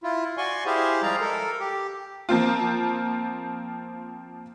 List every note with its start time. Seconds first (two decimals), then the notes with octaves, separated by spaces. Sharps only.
0.03 E4 F4
0.37 F#4 D5 G#5 C6 C#6
0.66 E4 G4 G#4 C5 F5
1.03 F3 G3 G#3 D5 F5 A#5
1.20 A4 A#4
1.60 G4
2.29 F3 A#3 C4 F4